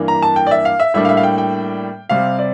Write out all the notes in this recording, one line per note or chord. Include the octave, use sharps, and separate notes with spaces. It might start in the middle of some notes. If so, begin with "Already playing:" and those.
Already playing: G2 E3 A#3 D4
A#5
A5
G5
D5
E5
F5
E5
A2 G3 A#3 D4 E5
F5
E5
F5
G5
G5
C3 G3 C4 F5
D5